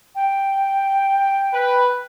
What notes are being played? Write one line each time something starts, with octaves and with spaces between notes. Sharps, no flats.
G5
B4